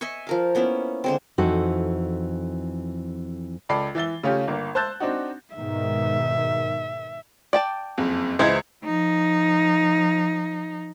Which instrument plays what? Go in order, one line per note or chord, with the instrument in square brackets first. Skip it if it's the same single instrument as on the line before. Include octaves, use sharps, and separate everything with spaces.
[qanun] D#5 E5 G#5 C#6
F3 A#4 F5
A#3 B3 C#4 E4
D3 G#3 C4
[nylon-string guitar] F2 E3 C4 D#4 F#4 A4
[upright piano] C#2 A4 D5 B5 C7
E3 E5 A6 G7
C#3 A3 C#4 F4 G4
G1 A#3
C5 A5 E6 F#6 G6 A6
C4 D4 D#4 F#4
[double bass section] G#2 B2 D#3 [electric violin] E5
[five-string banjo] D5 G5 A5
[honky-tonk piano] F#1 F2
[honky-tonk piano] C#2 D#5 G#6 [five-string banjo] E3 C5
[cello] F3 D#4